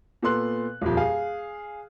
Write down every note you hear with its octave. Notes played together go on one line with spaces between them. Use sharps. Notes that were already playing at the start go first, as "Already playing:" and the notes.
A#2 B3 A4 C6 F#6
D#1 F2
G#4 F5